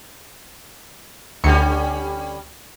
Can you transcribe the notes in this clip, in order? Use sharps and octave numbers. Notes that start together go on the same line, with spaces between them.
D2 D3 G3 C#4 C#7